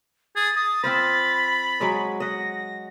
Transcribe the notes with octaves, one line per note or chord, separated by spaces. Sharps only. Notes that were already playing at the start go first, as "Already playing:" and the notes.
G#4 A6
D#6
C4 F4 C5 B5
F#3 G#3 D#5
D#5 F#5 A#6